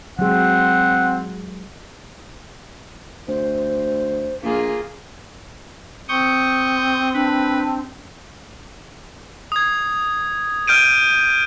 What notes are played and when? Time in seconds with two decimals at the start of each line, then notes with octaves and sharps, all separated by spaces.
0.19 F#3 G#3 C4 G#4 F#5
3.28 D2 C5
4.43 A#1 A#3 F4 G#4
6.09 C4 C#6 D#6 G6
7.14 D4 B4
9.52 D#6 G#6
10.67 F6 G6 D7 D#7